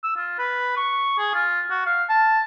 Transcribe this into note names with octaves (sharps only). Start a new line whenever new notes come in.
E6
F4
B4
C#6
G#4
F4
F#4
F5
A5